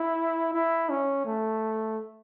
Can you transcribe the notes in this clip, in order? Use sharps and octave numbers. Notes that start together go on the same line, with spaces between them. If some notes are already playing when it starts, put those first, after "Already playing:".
Already playing: E4
E4
C#4
A3